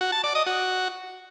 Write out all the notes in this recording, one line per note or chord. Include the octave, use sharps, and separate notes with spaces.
F#4
A5
D5
D#5
F#4